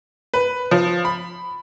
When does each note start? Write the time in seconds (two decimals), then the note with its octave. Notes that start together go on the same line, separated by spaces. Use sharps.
0.34 B4
0.71 F3
1.05 B5